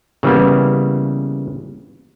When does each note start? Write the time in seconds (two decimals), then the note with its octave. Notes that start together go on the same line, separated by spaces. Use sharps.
0.23 C#3 E3 G3 A#3 B3